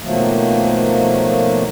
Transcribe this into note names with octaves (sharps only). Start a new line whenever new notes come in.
B2 D#3 F3 F#3 A3 A#3